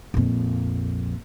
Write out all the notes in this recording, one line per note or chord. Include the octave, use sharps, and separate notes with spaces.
A#1 F2